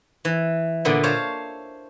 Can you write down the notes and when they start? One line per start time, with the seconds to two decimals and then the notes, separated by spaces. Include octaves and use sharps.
0.25 E3
0.85 A#2 D3 B3
1.04 C5 C#5 F5 A5